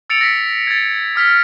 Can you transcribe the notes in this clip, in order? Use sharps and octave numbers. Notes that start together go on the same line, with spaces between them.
E6 A6 C#7 D7 F7
A#6 B6
G#6 A6
D#6 F6 B6